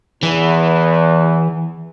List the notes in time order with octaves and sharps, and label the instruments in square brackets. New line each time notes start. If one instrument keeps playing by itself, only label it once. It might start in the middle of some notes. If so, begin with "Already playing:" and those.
[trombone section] E2 [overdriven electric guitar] E3